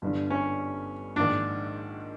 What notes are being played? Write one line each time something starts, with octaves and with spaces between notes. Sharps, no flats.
G1 G2 D3
C#4
A#1 G#2 D#3 D4